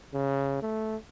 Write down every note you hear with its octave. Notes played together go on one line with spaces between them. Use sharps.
C#3
A3